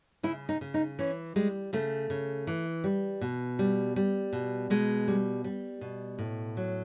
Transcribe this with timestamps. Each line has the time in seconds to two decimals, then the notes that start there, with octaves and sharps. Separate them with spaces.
0.23 C#3 E4
0.49 D#4
0.61 C#3
0.74 D#4
0.99 E3 C#4
1.36 G3 G#3
1.73 C#3 A3
2.10 C#3
2.47 E3
2.84 G3
3.21 B2
3.59 G3
3.96 G3
4.33 B2
4.70 B2 G#3
5.08 G3
5.44 G3
5.81 B2
6.19 A2
6.57 F#3